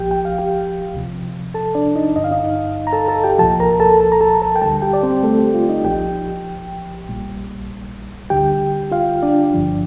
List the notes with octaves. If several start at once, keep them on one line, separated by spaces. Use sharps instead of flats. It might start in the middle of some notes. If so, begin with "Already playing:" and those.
Already playing: A#1 A#2 F3 G4 G5
G5
F5
G4 G5
D2 C3 F3
A4 A5
D4 D5
D#4 D#5
G1 G2 D3 D#5
F5
D#4 D#5
A#5
A4 A5
A4 A5
G4 G5
C2 A#2 F3 A4 A5
A#4 A#5
A4 A5
A4 A5
A#5
A4 A5
A4 A5
G5
D2 D3 G3 A4 A5
G4 G5
D5
C4 C5
A3 A4
G4
F4
D#4 D#5
A#1 A#2 F3 G4 G5
A#1 A#2 G3
D2 D3 G3 G4 G5
F4 F5
D4 D5
G1 G2 D3 F3